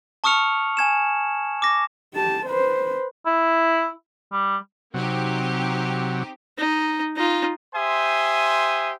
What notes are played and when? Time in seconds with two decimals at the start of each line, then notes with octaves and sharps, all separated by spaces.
0.24 A5 C#6 D#6 F6 C#7 F7
0.77 G#5 G#6 E7
1.62 D6 A#6
2.14 G4 A5
2.46 B4 C5
3.26 E4
4.33 G3
4.94 C3 F#3 C4 D#4 G4
6.58 D#4
7.16 D#4 F4
7.74 G4 C5 E5 G#5 C6 D#6